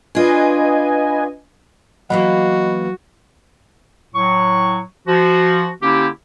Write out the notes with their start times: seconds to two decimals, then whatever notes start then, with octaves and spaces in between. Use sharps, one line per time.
0.15 D4 F4 B4 D#5 G#5
2.10 E3 F#3 A#3 B3 F#4 D#5 F#5 B5
4.15 A2 F#3 C#6
5.08 F3 F#4
5.82 D3 A#3 C#4 E4 G4